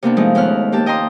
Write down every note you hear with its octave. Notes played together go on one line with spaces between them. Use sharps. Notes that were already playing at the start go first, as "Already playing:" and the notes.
C3 A#3 B3 D4
F3 G#3 A3 D#4
D#2 B3 C#4 F6 F#6
A#3 G4 A5
D#5 G5 A5 A#5 C6 D#6